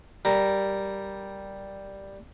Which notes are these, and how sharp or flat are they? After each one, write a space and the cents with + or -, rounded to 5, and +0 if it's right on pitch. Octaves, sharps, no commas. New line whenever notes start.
G3 +0 A#4 +0